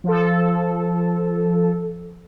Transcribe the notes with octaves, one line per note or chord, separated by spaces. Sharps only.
F3 A4